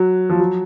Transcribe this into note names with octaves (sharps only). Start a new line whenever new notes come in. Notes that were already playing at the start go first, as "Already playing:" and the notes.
Already playing: F#3
F3
F#3